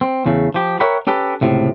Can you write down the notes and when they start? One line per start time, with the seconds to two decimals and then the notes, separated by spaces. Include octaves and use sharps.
0.01 C4
0.26 E2 C#3 A3
0.54 F3 G4
0.80 A#4 C#5 E5 F#5 G5 B5
1.07 C#4 G4 A4 B4
1.41 C#2 A2 C3